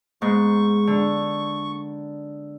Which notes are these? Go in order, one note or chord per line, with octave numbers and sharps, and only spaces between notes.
G#2 B3 C#6
D3